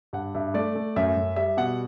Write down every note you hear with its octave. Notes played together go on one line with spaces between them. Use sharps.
G2 F#5
G2 E5
A3 D5
A3
F#2 E5
F#2
G3 E5
B2 F#5